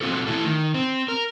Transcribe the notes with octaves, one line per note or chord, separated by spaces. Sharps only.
B2 C4 F4 F#4 A4
E3 A3 E4 A4
D#3
C4
A#4